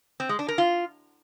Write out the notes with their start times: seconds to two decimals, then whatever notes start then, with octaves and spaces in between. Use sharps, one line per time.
0.20 C4
0.29 G#3
0.39 D4
0.48 A#4
0.58 F4